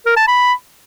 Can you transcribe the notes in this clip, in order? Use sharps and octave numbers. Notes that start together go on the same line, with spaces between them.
A#4
A5
B5